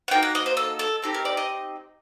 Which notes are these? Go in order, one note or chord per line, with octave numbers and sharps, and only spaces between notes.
F#5
A#3 D#4 F#4 G5
F#5
D#5
C5
A4
A4
C4 D#4 G4 A4
A#4
D5
D#5